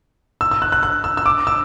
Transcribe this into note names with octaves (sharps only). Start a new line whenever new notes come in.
E6
E6
F#6
F#6
F#6
E6
E6
D6
E6